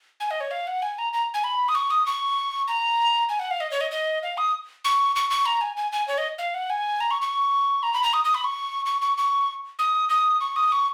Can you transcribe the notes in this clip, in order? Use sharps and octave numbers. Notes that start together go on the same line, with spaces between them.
G#5
D#5
C#5
F5
F#5
G#5
A#5
A#5
G#5
B5
D#6
C#6
D#6
C#6
A#5
G#5
F#5
F5
D#5
C#5
D#5
D#5
F5
D#6
C#6
C#6
C#6
A#5
G#5
G#5
G#5
C#5
D#5
F5
F#5
G#5
A#5
C#6
C#6
A#5
B5
A#5
D#6
D#6
B5
C#6
C#6
C#6
C#6
D#6
D#6
C#6
D#6
C#6